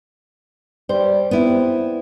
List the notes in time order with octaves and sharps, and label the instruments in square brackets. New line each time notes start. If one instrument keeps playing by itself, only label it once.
[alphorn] G3 [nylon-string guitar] C5
[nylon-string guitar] B3 E4 [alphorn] C4